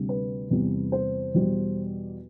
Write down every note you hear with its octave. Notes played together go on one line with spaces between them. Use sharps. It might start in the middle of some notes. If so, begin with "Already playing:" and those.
Already playing: D2 C3 G3
B4
E2 C3 G3
C5
E2 B2 G3